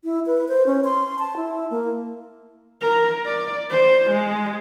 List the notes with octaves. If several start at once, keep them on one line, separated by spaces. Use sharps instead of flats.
E4
B4
C5
C#4
C6
A5
E4
A#3
A#4
D5
C5
G#3